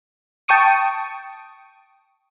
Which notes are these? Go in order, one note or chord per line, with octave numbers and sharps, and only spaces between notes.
G5 A5 C#6 D#6 D7